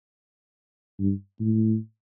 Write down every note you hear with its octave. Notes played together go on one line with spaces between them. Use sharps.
G2
A2